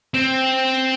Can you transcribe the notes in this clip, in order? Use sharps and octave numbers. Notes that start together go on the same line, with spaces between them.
C4